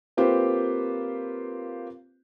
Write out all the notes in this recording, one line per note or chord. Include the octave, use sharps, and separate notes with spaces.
A#3 C4 F4 G4 B4 C5